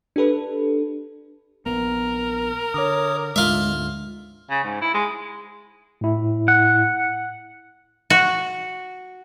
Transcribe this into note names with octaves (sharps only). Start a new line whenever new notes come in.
D4 G4 A4 B4
A#1 B3 A#4
D3 C#5 D6 D#6
D2 G#2 D3 G#3 F4 E5
C#3
G#2
E4
G#3
A2 E4
F#5
F#4